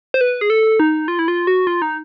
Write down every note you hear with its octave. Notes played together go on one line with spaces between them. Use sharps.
C5
B4
G#4
A4
D#4
F4
E4
F4
F#4
F4
D#4